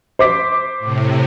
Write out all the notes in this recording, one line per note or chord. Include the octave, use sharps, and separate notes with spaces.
C5 D6 B6
A2 C3